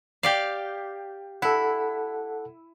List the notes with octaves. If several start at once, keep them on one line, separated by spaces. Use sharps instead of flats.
G4 D5 F5
E4 A4 F#5